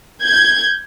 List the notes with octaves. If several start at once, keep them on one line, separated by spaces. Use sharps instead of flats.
G6 G#6